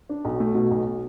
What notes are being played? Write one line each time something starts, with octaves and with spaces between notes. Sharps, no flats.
D4
B1
A3
B2
B1